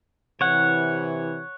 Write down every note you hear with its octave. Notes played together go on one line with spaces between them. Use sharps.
C3 E3 C#5 F#5